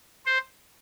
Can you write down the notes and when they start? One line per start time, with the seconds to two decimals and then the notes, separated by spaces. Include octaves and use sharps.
0.26 C5